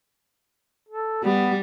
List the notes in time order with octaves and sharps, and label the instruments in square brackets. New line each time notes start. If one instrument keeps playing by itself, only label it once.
[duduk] A4
[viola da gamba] G3 [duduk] B3